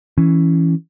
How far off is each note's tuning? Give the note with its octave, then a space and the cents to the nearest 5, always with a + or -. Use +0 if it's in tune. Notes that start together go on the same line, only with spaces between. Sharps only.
E3 +0 C#4 +0